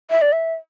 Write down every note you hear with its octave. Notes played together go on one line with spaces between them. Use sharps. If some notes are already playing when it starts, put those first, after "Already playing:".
E5
D5
E5